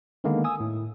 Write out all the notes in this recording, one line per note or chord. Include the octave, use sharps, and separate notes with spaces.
D3 D#3 G#3 A#3 B3
G#5 D#6 E6
A2